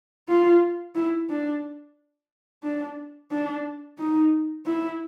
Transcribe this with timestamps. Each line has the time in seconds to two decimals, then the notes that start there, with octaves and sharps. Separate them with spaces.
0.28 F4
0.95 E4
1.29 D4
2.63 D4
3.31 D4
3.98 D#4
4.66 E4